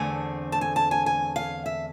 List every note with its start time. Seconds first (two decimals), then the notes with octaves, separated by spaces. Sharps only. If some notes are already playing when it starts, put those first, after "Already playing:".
Already playing: E2 D3 A3 C4 G#5
0.52 A5
0.61 G#5
0.76 A5
0.91 G#5
1.06 G#5
1.36 F5
1.66 E5